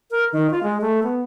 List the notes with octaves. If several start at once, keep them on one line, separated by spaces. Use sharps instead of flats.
A#4
D#3
F4
G#3
A3
B3